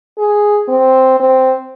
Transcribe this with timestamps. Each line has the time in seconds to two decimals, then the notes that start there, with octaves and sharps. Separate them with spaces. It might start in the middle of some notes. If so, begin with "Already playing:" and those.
0.18 G#4
0.68 C4
1.20 C4